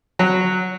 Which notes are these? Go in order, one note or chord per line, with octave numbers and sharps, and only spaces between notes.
F#3